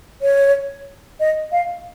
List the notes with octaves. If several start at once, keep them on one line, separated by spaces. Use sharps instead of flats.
C#5
D#5
F5